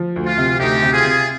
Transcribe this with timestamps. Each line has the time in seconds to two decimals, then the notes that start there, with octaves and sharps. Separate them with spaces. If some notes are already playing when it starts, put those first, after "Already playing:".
Already playing: F3
0.16 D2
0.26 F4
0.38 C3
0.59 D2 D#4 G4
0.82 C3
0.93 F4 G#4
1.04 C3